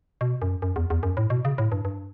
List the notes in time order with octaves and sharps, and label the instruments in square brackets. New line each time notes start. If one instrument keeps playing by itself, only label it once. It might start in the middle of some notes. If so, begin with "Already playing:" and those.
[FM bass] B2
F#2
F#2
E2
E2
F#2
A2
B2
C#3
A2
G2
G2